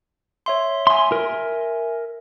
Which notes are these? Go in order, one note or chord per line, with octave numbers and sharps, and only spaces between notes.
C#5 E5 C6
E5 G#5 C6
A#4